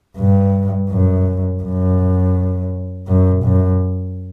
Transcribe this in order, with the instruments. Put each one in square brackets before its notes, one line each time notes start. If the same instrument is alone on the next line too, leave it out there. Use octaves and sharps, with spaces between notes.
[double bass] G2
F#2
F#2
F#2
F#2